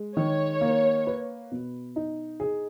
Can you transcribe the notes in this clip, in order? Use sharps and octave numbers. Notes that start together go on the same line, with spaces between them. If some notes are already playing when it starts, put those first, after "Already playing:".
Already playing: G#3
D#3 C#5
A#3
B4
B2
D#4
G#4